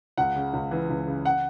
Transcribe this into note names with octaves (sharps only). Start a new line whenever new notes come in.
C#2 F#5
C#3
C#2
E3
C#2
C#3
F#5